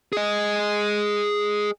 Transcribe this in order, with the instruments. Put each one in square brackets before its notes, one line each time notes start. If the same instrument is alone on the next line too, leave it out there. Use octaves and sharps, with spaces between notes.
[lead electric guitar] G#4 D#5